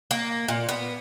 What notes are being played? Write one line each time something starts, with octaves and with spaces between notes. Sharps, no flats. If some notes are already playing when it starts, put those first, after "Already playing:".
A#3
A#2
B3